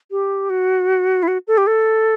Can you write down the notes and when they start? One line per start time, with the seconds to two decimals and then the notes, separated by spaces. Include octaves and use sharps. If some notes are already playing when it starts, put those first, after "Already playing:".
0.11 G4
0.50 F#4
1.23 E4
1.28 F#4
1.47 A4
1.58 G4
1.67 A4